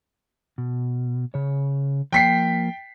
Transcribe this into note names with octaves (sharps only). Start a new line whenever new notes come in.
B2
C#3 C#5
F3 A#3 G5 B6 C7